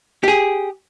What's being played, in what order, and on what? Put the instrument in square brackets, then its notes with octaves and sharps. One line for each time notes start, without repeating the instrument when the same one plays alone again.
[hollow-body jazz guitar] G4 G#4